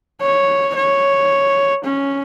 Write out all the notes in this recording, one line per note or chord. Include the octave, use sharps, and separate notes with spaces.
C#5
C#5
C#4